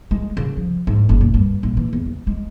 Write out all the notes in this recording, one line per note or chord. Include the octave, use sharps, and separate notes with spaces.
G#3
C#3
F3
G#2
F#1
A#2
G2
A#1
E3
E2
C#3
G#3